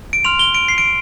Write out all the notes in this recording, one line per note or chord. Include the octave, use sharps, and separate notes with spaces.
D7
C6 F6 F7
G7
D7
C7
D7